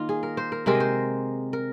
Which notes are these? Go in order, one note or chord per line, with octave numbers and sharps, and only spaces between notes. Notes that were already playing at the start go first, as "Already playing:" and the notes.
Already playing: D#3 A#3 F4
G#4
A#4
C5
A#4
C3 G#3 C4 A#4
D#5
C5
A#4